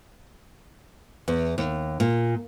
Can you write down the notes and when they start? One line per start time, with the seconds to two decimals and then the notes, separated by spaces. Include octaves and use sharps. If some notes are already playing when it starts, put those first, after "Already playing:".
1.28 E2
1.58 D#2
2.00 A#2